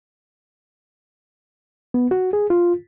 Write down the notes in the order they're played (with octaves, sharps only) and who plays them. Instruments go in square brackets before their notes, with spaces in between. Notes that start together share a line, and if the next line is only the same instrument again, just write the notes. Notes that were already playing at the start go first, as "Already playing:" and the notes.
[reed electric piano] B3
F#4
G#4
F4